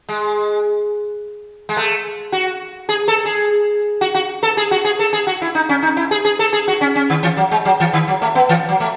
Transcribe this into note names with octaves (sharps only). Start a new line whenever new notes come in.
G#3
G#3
A3
F#4
G#4
A4
G#4
F#4
F#4
A4
G#4
F#4
G#4
A4
G#4
F#4
E4
D#4
C#4
D#4
E4
G#4
G#4
A4
G#4
F#4
C#4
C#4
D#3
E3
F#3
G#3
F#3
E3
D#3
F#3
A3
B3
E3
F#3
A3